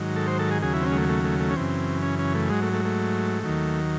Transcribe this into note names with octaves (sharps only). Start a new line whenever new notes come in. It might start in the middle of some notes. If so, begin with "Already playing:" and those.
Already playing: G#2 D#3 F#3
A4
C5
A4
G#4
D#2 C#3 F#3 G#4
E4
C4
C#4
G#3
A3
A3
A3
A3
C#4
F#2 C#3 E3 C4
C#4
C#4
A3
G#2 F#3 G#3
A3
A3
A3
D#2 D#3 F#3